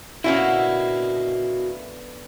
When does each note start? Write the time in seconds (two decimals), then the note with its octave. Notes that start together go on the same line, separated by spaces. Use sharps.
0.24 D3 A#3 B3 C#4 E4 F#4 D#5